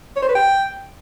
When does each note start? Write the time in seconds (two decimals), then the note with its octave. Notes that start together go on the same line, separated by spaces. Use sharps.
0.16 C#5
0.23 C5
0.29 B4
0.35 G5